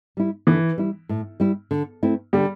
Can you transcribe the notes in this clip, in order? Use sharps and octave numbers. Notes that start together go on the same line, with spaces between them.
G3 E4
D3 E3
G3 E4
A2
G3 E4
D3
A3 C4 E4
D3 G3